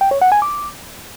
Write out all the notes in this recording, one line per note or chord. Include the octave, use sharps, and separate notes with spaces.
G5
C#5
F#5
G#5
D6